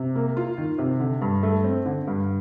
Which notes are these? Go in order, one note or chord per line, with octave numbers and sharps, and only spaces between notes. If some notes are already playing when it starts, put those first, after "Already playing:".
Already playing: C3
A#3
F4
D#3
C3
D3
G2
A3
C4
D3
G2